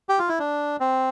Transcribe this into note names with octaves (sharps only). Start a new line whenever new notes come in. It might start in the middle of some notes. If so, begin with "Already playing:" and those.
G4
F4
E4
D4
C4